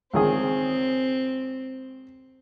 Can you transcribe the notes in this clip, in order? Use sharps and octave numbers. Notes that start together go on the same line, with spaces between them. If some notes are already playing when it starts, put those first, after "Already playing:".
C#2 D#3 C4 G#4